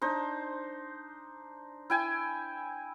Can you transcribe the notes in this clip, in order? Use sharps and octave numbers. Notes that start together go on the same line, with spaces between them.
D4 D#4 C5
E4 G5 G#5